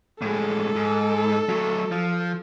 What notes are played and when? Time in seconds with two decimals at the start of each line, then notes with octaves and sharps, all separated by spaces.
0.22 A2 G#3 A4
0.76 G#2
1.49 F#3 A3
1.92 F3